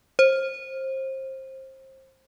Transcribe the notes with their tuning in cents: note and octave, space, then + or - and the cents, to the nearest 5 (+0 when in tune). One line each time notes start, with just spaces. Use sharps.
C5 +25